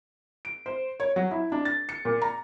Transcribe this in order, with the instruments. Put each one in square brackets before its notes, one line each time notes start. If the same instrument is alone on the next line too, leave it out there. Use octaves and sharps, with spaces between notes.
[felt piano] D7
C5
C#5
F#3
E4
D4
A6
C#7
A#2
A#5